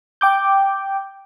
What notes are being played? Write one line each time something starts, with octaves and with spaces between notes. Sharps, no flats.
G5 D6 G6